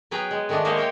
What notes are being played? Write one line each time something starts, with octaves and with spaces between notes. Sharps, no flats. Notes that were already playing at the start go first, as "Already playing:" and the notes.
F#3 B3 G#4 B4 G5 A#5
G#3
D#3 G#3 A3 B3 D4
G#3 A#3 C5 C#5 D#5 E5
A#4 C#5 G5